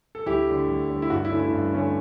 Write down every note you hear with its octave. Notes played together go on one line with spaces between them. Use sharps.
A4
D2 E4 G4
D3 A3
D2
D3 A3
E4
G2 F#4
E4
D3 A3 C#4
E4
G2
D3 A3 C#4